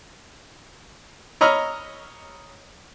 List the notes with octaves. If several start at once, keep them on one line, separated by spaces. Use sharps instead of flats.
C#5 D#5 A#5 B5 E6 F6